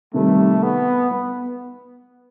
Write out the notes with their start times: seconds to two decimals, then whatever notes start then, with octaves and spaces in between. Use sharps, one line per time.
0.14 C3 D#3 G3 A3
0.63 B3
1.11 B3